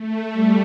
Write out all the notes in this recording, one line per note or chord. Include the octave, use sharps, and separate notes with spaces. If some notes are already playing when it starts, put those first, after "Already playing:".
Already playing: A3
G3